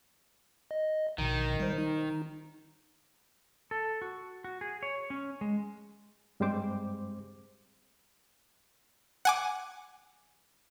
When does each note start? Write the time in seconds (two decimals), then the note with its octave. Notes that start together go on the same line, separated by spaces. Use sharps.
0.71 D#5
1.18 A#1 B2 D#3
1.60 G3 C5
1.78 D#4
3.71 A4
4.02 F#4
4.44 F#4
4.61 G#4
4.83 C#5
5.10 C#4
5.41 G#3
6.40 G2 G3 G#3 C4 C5 D6
9.25 F#5 G#5 D6